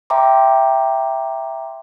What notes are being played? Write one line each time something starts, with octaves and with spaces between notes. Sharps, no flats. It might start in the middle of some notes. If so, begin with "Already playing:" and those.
E5 G5 A#5 C6 D6